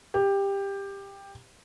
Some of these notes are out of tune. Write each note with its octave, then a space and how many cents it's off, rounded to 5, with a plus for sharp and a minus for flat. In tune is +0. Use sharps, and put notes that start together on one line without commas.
G4 +15